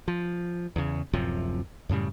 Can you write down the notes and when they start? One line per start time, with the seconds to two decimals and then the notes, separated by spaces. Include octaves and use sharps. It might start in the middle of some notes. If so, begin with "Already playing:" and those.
0.08 F3
0.76 E2 C#3
1.13 D1 F#2 C3 F3
1.89 F#2 A2 C#3 G3